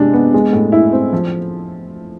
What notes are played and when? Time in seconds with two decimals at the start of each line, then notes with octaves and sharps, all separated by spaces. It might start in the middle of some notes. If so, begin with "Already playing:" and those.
Already playing: C3 G#3 D4
0.13 B3
0.34 G#3
0.53 A2
0.72 E4
0.92 C4
1.13 F3